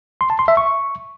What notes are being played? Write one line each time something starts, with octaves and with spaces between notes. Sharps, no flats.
C6
A5
C6
E5
C#6